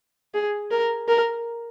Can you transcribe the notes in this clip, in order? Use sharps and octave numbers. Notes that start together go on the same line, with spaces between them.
G#4
A#4
A#4